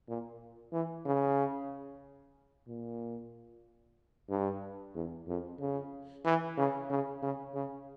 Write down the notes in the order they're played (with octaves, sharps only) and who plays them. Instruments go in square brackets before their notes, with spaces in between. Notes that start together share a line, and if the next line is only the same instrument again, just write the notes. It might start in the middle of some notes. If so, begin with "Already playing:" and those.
[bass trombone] A#2
E3
C#3
A#2
G2
E2
F2
C#3
E3
C#3
C#3
C#3
C#3